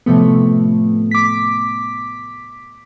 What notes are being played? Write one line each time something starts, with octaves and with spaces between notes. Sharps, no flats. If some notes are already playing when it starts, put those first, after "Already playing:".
A2 C3 F3 A3 B3
D6 B6